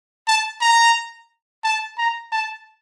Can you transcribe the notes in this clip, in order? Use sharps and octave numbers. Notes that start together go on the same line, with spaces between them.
A5
A#5
A5
A#5
A5